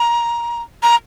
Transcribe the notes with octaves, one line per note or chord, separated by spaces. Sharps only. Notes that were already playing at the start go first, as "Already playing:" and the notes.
Already playing: A#5
A#5